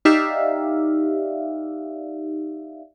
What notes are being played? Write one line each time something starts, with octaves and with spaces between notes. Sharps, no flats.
D#4 G4 D5 E5 F5